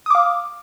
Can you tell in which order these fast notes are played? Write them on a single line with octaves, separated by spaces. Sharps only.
D#6 D6 F5